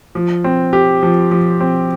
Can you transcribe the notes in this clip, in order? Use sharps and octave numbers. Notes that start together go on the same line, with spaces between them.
F3
C4
G4
F3
F3
C4